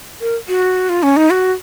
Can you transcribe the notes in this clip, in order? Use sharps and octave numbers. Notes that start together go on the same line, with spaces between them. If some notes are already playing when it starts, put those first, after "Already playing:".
A#4
F#4
F4
C#4
D#4
F#4